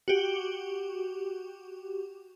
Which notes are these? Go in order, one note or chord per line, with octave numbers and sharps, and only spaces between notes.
F#4 G4